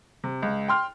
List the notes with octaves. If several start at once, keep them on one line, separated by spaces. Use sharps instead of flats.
C3
C#2
G5 C6 F6